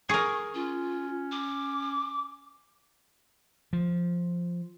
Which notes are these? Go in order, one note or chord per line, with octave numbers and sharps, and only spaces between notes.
G#4 A#4 C#6
C#4 F4
D6
F3